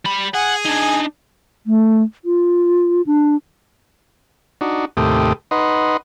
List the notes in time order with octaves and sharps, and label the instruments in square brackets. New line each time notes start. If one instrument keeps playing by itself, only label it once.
[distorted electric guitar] G3 B5
[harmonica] G#4 G#5 [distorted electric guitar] F#5
[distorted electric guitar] D4 D#4
[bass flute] A3
F4
D4
[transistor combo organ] D4 D#4 F#4
D#2 A2 C3 A3 G4 D#6
D#4 B4 D#5 F#5 C6